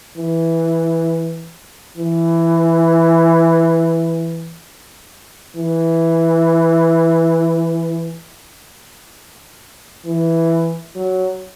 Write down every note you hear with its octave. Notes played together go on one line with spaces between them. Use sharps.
E3
E3
E3
E3
F#3